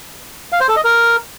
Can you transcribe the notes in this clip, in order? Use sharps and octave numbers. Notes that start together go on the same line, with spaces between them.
F5
C5
A4
D#5
A#4